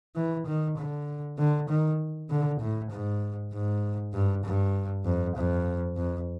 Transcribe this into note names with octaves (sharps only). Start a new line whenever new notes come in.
E3
D#3
D3
D3
D#3
D3
A2
G#2
G#2
G2
G2
F2
F2
F2